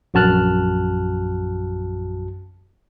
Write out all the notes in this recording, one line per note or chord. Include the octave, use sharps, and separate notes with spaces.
A#1 F#2 F#4 A5 F6 F#6